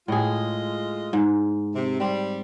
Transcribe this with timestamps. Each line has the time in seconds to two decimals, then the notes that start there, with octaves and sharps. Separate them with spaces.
0.08 A2 G#3 F4 G#4 D#5
1.13 G#2
1.75 C3
2.00 G3 C4